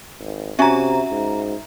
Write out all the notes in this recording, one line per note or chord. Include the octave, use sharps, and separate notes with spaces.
G#1
C3 C#4 F#4 E5 A#5
G#2